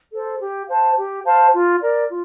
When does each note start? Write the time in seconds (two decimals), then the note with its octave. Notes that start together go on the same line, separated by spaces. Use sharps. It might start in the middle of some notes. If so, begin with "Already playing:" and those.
0.13 A4 C5
0.40 G4
0.68 C5 F5 A5
0.96 G4
1.24 C5 F5 A5
1.53 F4
1.81 A#4 D5
2.09 F4